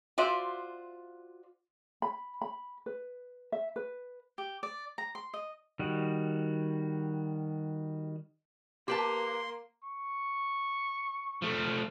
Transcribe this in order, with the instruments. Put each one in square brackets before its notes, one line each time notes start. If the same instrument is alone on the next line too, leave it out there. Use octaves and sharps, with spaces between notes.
[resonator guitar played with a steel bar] F4 F#4 C5 D5 E5
[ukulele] B5
B5
B4
E5
B4
[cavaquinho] G4
D5
A#5
C6
D#5
[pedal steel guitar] D#3 G3 F#4
[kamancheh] A#3 [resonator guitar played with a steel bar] G4 B4 A5 [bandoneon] C6
[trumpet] C#6
[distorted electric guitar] F3 A3